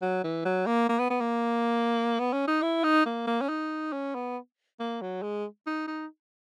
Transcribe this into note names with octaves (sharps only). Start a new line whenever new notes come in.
F#3
E3
F#3
A#3
A#3
B3
B3
A#3
B3
C#4
D#4
E4
D#4
A#3
A#3
C#4
D#4
C#4
B3
A#3
F#3
G#3
D#4
D#4